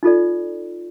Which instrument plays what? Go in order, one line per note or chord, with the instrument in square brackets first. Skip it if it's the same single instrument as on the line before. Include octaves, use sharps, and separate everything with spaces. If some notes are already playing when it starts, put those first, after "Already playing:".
[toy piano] D#4 F4 A4 D5